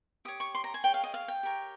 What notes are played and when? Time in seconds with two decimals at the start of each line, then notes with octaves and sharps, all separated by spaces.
0.25 G4 C#5 D#6
0.40 C#6
0.55 C6
0.64 A#5
0.74 G#5
0.84 G#4 C#5 G5
0.94 F5
1.04 D#5
1.14 F5
1.28 G5
1.43 G4 A#4 C#5